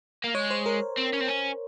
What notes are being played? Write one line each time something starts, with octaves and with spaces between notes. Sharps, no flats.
A#3
G#3 C#5
C5
A#4
C4
C#4
C4
C#4